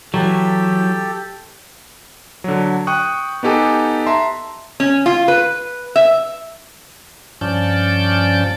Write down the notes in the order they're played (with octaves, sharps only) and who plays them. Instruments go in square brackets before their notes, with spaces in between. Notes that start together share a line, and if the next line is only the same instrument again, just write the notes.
[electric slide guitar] E3 [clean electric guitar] F#3 [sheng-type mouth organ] G4 A4
[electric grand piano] D3 F#3
G5 C#6 D#6 F#6
B3 D#4 G4 A4 G#5
E5 A5 A#5 C6
[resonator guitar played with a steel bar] C#4
F4
B4
E5
[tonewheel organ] G2 F3 C#4 D5 A5 G6